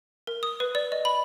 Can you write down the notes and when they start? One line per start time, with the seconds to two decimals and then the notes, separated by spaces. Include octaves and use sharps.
0.27 A#4
0.43 D#6
0.60 B4
0.75 D5
0.92 D#5
1.05 B5